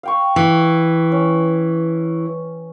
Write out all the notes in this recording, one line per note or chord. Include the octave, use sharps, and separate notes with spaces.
F5 G5 C#6
E3
C#4